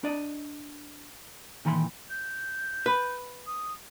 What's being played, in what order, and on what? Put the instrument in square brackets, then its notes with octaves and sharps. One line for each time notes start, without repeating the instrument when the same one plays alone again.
[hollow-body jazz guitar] D4 D5 D#5
A#2 D#3 E3 B5 C6
[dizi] G6
[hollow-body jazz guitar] B4
[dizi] D#6